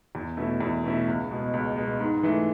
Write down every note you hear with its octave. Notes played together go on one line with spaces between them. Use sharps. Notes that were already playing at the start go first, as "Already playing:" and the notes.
E2
B2 A3 C#4 E4
E2
B2 A3 C#4 E4
C#2
B2 G#3
C#2
B2 G#3
G#2
E3 A3